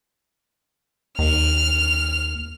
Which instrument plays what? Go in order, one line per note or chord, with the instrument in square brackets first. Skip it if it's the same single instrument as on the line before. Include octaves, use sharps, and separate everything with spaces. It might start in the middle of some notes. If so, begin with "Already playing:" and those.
[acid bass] D#2 [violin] F6